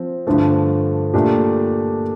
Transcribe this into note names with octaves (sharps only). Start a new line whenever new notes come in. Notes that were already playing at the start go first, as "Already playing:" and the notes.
Already playing: F3 C4 F4
G2 D3 F3 A3
A#2 A3 D4 G4